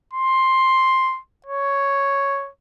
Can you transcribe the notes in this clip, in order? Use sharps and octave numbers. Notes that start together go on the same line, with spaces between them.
C6
C#5